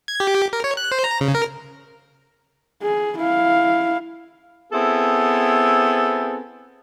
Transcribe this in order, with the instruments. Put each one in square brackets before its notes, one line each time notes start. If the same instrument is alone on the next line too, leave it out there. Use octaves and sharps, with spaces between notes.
[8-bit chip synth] G#6
G4
A#4
C#5
F#6
C5
A#5
C#3
A#4
[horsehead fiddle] G#4
E4 F5
[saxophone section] B3 C4 E4 G#4 A4